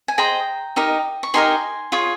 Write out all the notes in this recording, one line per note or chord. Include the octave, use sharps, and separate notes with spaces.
G#5
G#4 C5 D#5 G5 A#5
D#4 G4 A#4 D#5
C#6
D#4 G4 A#4 D#5 G#5 C6
F4 G#4 C#5